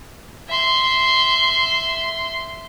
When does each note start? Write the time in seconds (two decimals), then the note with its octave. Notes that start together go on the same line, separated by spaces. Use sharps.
0.49 E5 C6